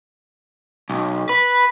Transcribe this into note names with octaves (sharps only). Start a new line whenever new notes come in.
B1
B4